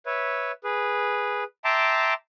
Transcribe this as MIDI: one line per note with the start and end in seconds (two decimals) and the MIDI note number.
0.06 0.52 71
0.06 0.52 73
0.06 0.52 76
0.64 1.44 68
0.64 1.44 71
1.65 2.14 76
1.65 2.14 79
1.65 2.14 81
1.65 2.14 82
1.65 2.14 84
1.65 2.14 86